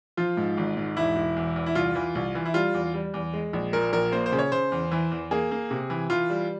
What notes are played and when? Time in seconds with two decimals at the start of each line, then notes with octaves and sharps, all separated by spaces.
0.17 F3 F4
0.37 G#2
0.58 G#1
0.77 G#2
0.97 E1 E4
1.16 E1
1.36 E2
1.56 E2
1.66 E4
1.75 C2 F4
1.95 E3
2.15 C2
2.35 E3
2.46 E4
2.54 G3 F4
2.74 E2
2.94 G3
3.14 E2
3.33 G#3
3.53 A#1
3.73 A#2 A#4
3.93 A#1 A#4
4.12 A#3 C5
4.26 C5
4.32 C#3
4.39 C#5
4.52 C#3 C5
4.72 E2
4.91 E3
5.11 E2
5.31 A#3 G#4
5.51 A#3
5.71 C3
5.90 E3
6.10 E3 F4
6.30 G3